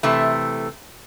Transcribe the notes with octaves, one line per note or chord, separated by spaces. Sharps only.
C3 E3 A3